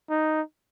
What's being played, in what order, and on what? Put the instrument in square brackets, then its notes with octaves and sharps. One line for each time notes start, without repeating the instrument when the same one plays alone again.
[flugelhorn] D#4